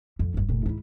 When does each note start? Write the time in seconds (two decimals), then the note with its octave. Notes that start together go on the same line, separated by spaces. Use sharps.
0.19 F2
0.34 D#1 G2
0.49 F1 A#2
0.66 G#2 E4